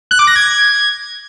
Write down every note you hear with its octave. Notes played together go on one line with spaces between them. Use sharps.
F#6
D6
A#6
G#6